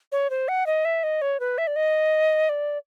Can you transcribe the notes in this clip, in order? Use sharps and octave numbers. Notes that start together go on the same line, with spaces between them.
C#5
C5
F#5
D#5
E5
D#5
C#5
B4
E5
D5
D#5
D5